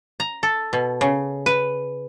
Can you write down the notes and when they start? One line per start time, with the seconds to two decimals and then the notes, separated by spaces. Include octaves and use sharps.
0.20 A#5
0.43 A4
0.73 B2
1.01 C#3
1.46 B4